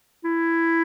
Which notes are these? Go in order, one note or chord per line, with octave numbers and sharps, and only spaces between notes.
E4